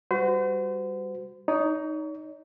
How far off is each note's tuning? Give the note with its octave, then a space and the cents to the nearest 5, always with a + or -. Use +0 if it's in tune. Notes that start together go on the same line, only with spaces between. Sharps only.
G3 +5 F#4 +0 C5 -40
D#4 +0 C#5 +40